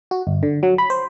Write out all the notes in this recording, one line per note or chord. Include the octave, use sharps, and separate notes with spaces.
F#4
G1
D3
F#3
B5
C5